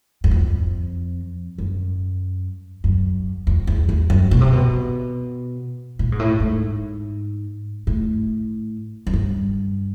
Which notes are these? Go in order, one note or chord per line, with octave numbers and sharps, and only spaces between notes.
F#2
F2
F#2
F#2
F2
E2
F2
F#2
B2
C3
B2
A#2
G#2
A2
G#2
A2
F#2
G2